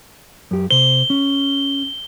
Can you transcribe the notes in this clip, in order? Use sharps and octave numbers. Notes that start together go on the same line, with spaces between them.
F#2 G4
C3 C5 G7
C#4